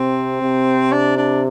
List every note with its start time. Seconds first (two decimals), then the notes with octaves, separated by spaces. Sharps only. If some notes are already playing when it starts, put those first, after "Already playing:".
Already playing: C3 C4
0.42 C3
0.92 D4
1.17 D4